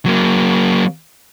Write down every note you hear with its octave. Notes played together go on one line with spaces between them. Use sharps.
F#3 A#3